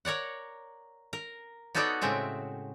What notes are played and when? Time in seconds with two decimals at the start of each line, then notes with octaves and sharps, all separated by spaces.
0.05 A#4 C#5 D5 F#5
1.13 A#4
1.75 B3 D#4 F#4 A4 C#5 D5
2.01 A2 C#3 G#3 C4 E5